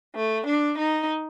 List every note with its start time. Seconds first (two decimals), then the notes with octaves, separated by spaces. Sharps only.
0.16 A3
0.48 D4
0.79 D#4